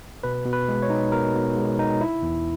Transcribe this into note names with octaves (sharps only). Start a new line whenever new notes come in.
B2 B4
B2
B4
G#3
C#5
D#4
B2 A#4
B2
G#3
D#4
E4
E2